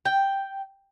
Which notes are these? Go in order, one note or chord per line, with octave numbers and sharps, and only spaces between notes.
G5